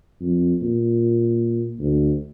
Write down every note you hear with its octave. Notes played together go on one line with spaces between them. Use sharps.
F2
A#2
D2